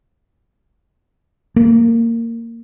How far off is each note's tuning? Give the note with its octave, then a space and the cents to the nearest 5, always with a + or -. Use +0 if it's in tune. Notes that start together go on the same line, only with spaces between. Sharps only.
A#3 -20